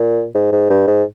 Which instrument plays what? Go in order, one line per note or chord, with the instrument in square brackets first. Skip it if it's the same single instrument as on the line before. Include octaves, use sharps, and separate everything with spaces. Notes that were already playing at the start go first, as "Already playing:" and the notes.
Already playing: [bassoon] A#2
G#2
G#2
G2
G#2